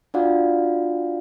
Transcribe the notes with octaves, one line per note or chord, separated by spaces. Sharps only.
D4 F4 F#4 D5 F5 F#5